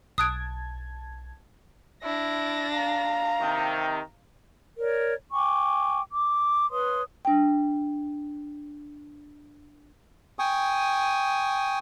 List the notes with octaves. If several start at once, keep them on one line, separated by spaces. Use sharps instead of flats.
B1 A5 D#6 F#6 G#6 D7
D4 E4 A#6
F5 A#5
C3 D#3
A#4 C#5 D5
G5 G#5 C#6 D6
D6
B4 C#5 C6 D#6
D4 G5
G5 G#5 C#6 D#6